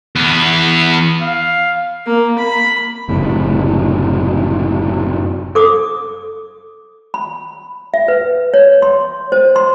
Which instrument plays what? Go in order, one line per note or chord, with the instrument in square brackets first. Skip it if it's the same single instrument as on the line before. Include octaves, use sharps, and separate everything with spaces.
[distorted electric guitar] E2 B3
[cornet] F5
[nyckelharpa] A#3
B5
[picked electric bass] F#1 A2 C3
[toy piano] A4 D6 D#6
B5
E5
B4
C#5
C6
C5
C6